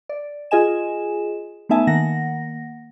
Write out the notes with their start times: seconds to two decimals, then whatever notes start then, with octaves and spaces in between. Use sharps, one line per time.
0.09 D5
0.51 F4 G#4 D#5 G#5 E7
1.69 A3 B3 D#4 E5 G#5 A5
1.87 D#3 A#3 F#5 A#6